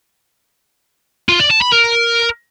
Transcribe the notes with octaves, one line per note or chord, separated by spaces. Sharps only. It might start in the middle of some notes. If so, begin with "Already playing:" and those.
F4
D5
A5
B5
A#4